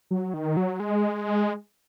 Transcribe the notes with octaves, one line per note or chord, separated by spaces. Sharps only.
F#3
D#3
F#3
G#3